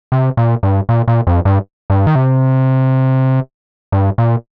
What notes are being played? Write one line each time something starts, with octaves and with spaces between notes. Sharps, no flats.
C3
A#2
G2
A#2
A#2
F2
G2
G2
D#3
C3
G2
A#2